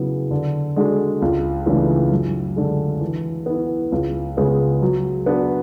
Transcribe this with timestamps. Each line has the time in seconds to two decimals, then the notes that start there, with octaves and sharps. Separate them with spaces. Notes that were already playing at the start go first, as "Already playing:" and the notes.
Already playing: C#3 F#3 B3 E4
0.31 D3
0.76 G#3 D4 F#4 A4
1.22 C#2
1.66 C#3 E3 A3 D4
2.12 F#2
2.56 D3 G#3 D4 A4
3.01 E3
3.46 B3 E4
3.92 C#2
4.37 C#3 G#3 B3
4.82 F#3
5.26 B3 D4 F#4 B4